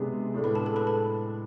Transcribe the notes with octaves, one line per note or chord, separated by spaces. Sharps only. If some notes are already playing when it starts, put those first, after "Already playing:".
Already playing: C3 G#3 B3 D4 G#4
A2 G#3 D4
B4 B5
A4 A5
A4 A5
B4 B5
A4 A5